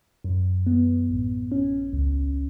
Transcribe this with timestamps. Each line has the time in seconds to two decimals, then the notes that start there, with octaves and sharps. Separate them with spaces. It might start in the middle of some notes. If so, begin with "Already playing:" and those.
0.24 F#2
0.67 B3
1.09 A1
1.51 C#4
1.93 C#2